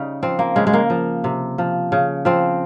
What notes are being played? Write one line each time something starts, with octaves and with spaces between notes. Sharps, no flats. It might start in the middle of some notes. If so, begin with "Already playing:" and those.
Already playing: C#3 G3 D#4
F3 C4
A#3
C#3 G#3
G#3
A#3
F3
C3
F3
C#3
F3 C4